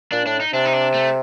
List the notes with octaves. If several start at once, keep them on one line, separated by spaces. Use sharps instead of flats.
A#2 D4
A2 D4
D#4
C3 D4
D#4
D4
A3